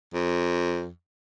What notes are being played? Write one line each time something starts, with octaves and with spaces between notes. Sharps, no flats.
F2